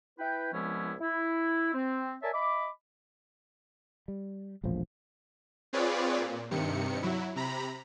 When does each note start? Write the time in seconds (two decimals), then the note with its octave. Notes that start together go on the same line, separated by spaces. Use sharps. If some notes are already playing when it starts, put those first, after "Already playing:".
0.19 E4 B4 G5
0.53 C2 F3 G#3 B3 C#4 E4
1.01 E4
1.74 C4
2.23 A#4 C#5 D5 E5 G#5 A5
2.34 D#5 E5 B5 D6
4.08 G3
4.64 E1 A#1 A2 F3
5.73 C4 F4 G#4 B4 C#5 D5
6.18 A#2
6.51 G2 C3 D#3 C#7
7.03 F#3 E4
7.36 C3 A#5 B5